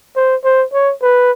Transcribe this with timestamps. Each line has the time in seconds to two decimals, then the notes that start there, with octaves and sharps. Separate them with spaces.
0.16 C5
0.44 C5
0.73 C#5
1.02 B4